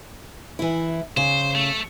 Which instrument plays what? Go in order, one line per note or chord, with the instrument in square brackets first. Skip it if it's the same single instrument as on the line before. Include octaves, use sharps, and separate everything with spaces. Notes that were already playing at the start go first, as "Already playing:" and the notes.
[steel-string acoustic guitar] E3 E4
[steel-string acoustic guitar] C#3 [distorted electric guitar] C5
[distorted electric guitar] A3